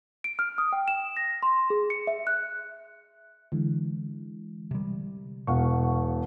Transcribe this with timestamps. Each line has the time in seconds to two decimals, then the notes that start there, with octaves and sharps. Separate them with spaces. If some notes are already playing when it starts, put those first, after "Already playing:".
0.24 D7
0.39 F6
0.58 D#6
0.73 G5
0.88 E7
1.17 A#6
1.43 C6
1.70 G#4
1.90 C#7
2.07 E5
2.27 F#6
3.52 D3 E3 G#3
4.71 C3 G3
5.47 E1 B2 F5 F#5 C#6